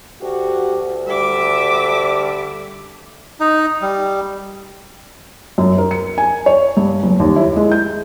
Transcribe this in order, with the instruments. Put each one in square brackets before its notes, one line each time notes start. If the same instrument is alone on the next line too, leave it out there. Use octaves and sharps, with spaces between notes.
[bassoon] D2 [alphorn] F#4 [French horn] G4
[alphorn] D3 [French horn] G3 [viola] E5 D6
[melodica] D#4
G3
[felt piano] F#2
A#4
C#7
G#5
C#5
G2
F#1
D#2
E4
G#3
G6